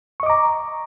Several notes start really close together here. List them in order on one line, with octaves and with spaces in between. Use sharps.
C#6 D#5 D6 A#5